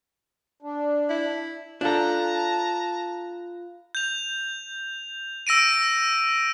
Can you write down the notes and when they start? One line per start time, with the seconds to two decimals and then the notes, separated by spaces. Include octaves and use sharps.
0.62 D4
1.09 E4
1.81 D4 F4 A4 F5 A5 A#5 F#6
3.95 G6 F7
5.47 E6 A#6 D7 D#7